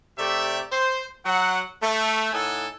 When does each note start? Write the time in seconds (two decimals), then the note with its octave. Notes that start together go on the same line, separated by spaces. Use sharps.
0.17 C3 A3 G4 D5 E5
0.71 C5
1.24 F#3 F#5
1.82 A3
2.32 A2 D#4 A4 F#5 G#5